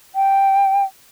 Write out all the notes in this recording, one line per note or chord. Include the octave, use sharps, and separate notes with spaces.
G5